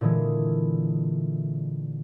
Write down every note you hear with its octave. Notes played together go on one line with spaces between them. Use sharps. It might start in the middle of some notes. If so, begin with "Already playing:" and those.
A#2 D3 E3 G#3